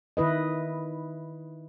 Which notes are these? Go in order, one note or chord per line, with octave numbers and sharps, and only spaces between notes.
D#3 E4 B4 D#5